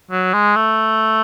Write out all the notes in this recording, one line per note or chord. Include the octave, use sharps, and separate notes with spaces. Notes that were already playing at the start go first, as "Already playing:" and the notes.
F#3
G#3
A3